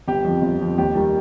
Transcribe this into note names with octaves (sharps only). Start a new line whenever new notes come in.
G1 G4
F2 F3
G1
F2 F3
D#2 G4
D#3 G3